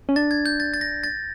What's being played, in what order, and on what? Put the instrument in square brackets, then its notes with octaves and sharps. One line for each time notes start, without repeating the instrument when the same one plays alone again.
[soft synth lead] C#4
[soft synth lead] D4 [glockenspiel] A6
[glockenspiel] G#6
G6
A6
A6
A#6
A6